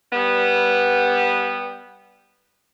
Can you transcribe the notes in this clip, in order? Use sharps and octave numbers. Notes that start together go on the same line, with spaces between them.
G3 B3